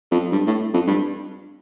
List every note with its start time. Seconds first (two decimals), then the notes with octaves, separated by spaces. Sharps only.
0.11 F2
0.32 G2
0.47 A2
0.73 F2
0.88 G2